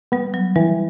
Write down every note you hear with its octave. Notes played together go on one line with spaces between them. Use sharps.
G3 B3
F#3
E3 G3